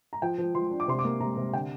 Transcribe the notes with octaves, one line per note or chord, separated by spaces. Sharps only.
A#5
F3 G5
F3
F3 C6
D4
D6
C3 C6
D6
A#3
C3 A#5
C3
D3 G5